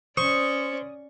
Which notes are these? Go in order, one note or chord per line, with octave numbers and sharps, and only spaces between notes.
C#4 C5 D5 C#6 D#6